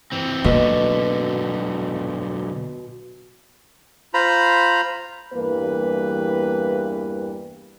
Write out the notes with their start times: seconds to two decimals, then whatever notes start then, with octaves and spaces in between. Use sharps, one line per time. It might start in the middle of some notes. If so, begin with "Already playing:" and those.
0.12 E3 C4
0.44 B1 B2 D3 A#3
4.14 F4 C5 A#5 B5
5.34 E2 G2 E3 G3 A#3 B4